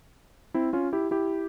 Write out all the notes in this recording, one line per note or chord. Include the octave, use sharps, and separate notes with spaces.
C4 E4
C#4 F4
E4 G4
E4 G4